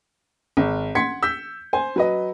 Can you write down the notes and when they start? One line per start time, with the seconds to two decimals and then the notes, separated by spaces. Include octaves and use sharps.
0.57 G#1
0.95 F#5 C6 G#6 B6 C#7
1.23 E6 G6 B6
1.73 C5 G#5
1.96 F#3 B4 D#5